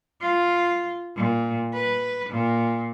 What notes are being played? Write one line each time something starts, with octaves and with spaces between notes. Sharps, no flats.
F4
A#2
B4
A#2